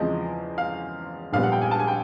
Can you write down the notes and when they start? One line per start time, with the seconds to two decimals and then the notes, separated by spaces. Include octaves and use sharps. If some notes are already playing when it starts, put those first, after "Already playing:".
Already playing: E2 C#3 F3 G#3 C4 D#5
0.58 F5
1.33 A#1 A#2 G3 B3 F5
1.43 F#5
1.52 G5
1.62 G#5
1.71 A5
1.79 G#5
1.87 G5